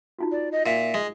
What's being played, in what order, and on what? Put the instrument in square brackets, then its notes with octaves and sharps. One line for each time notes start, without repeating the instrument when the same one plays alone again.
[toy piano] D#4 F4 F#4
[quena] D5
D#5
[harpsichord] A#2 [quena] E5
[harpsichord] G#3